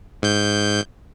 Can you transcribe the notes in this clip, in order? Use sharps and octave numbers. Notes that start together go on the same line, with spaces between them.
G#2 G6